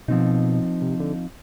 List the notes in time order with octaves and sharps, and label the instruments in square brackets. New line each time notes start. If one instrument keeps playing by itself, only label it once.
[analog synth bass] B2 [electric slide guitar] F3 C4 D#4
[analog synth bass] C3
D3